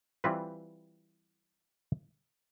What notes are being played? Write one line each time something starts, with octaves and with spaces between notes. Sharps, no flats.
E3 G3 C4 F4 B4